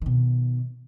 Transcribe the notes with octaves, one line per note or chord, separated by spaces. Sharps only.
B2 D#3